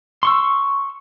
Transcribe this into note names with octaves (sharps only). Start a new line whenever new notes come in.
C6 C#6 E6